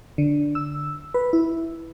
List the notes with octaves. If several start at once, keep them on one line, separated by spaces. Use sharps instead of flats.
D3
E6
B4
E4